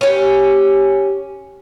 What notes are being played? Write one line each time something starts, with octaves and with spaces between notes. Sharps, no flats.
C#4 G4